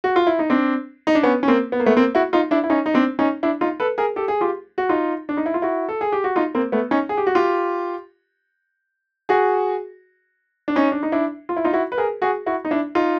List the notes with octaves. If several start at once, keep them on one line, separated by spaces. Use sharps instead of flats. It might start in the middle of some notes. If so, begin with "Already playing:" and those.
F#4
F4
E4
D#4
C4 D4
D#4
D4
B3 C#4
C#4
A#3 C4
B3
A#3
A3 B3
A#3 C4
E4 F#4
D#4 F4
D4 E4
E4
C#4 D#4
D#4
C4 D4
C#4 D#4
D4 E4
D#4 F4
A4 B4
G#4 A#4
G4 A4
G#4
F4 G4
F#4
D#4 F4
D4
D#4
E4
F4
E4 F#4
A4
G#4
G4
F#4
D#4 F4
A#3 C4
A3 B3
C#4 D#4
G#4
G4
F#4
F4 G4
F#4 G#4
D4
C#4 D#4
D4
D#4
D4 E4
F4
E4
D#4 F4
E4 F#4
B4
G#4 A#4
F#4 G#4
E4 F#4
D#4
D4 E4
D#4 F4